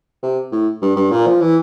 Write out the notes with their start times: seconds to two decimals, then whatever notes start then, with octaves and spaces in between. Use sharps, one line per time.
0.22 C3
0.52 A2
0.82 G2
0.96 G2
1.11 A#2
1.26 F3
1.41 E3